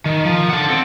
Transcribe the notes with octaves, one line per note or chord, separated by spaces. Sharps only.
D#3
F3
A4 F#5
C4